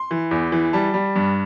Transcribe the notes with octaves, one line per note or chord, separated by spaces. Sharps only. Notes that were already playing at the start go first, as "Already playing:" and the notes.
Already playing: C6
E3
E2
E3
G3 A5
G3
G2